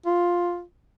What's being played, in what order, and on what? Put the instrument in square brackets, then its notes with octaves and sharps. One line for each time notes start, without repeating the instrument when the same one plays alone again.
[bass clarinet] F4